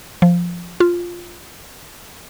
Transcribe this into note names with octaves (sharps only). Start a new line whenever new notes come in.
F3
F4